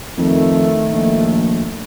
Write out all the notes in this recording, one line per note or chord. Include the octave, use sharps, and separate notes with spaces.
F2 D#3 A3
A#1